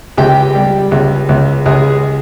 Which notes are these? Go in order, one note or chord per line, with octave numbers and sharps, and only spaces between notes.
C#2 G4 G5
G3
C#2
C#2
C#2 G#3 G#4